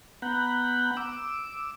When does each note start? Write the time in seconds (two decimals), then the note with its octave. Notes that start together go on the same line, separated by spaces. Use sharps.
0.22 B3 F#5 A#5 B5 F#6 G6
0.97 D6 E6